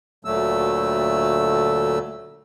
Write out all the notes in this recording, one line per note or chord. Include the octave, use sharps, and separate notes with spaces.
D2 A#2 D3 F#3 A3 E6